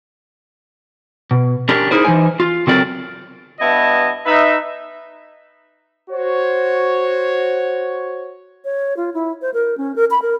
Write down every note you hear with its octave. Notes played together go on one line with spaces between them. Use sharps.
B2
C#4 D4 G4 A#4
D#4 E4 G#4 A#4 C5
E3 G#3 D#4 C5 G#5
F4
C#3 F#3 C4 A4 A#4 D5
G2 B3 E4 C#5 D#5 A5
D#4 B4 E5
F#4 C5 C#5
C#5
F4
E4
C5
A#4
C#4
A#4
B5
A#4